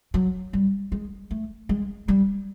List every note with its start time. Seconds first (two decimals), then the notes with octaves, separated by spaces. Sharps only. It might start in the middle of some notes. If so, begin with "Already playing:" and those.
0.14 F#3
0.53 G3
0.92 G#3
1.31 A3
1.69 G#3
2.08 G3